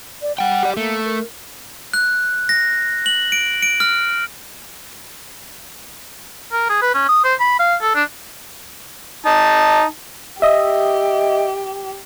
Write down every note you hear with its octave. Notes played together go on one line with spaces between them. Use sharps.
D5
G3 F#5 G5
G4 D5
A3 A#3
A#4
F#6
A#6
F#7
D7
D7
F6
A#4
G#4
B4
C#4
D#6
C5
B5
F5
A4
D4
D#4 A5
G4 D#5 E5